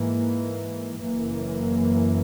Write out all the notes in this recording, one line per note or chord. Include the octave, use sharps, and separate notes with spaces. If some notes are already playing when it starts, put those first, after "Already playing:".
Already playing: G#2 E3 A#3
F#1 F#2 E3 A#3